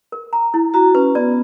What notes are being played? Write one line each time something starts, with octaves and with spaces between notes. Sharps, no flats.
A#4
A#5
E4
F#4 A#5
C#4 B4
B3 D5